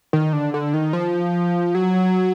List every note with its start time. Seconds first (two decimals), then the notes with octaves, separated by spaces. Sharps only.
0.13 D#3
0.33 D3
0.54 D3
0.74 D#3
0.93 F3
1.75 F#3